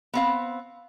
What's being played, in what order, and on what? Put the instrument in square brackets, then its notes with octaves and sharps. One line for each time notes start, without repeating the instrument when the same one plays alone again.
[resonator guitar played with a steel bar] B3 C4 F5